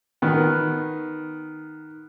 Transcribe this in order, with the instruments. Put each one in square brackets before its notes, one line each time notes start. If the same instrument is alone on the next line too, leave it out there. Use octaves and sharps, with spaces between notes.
[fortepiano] D#3 B3